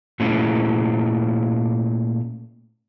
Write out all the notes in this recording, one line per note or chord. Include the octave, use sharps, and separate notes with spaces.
A#2 A3 C#4 E4 G#4 C#5